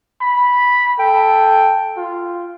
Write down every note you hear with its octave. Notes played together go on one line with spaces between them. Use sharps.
B5
A4 G5
F4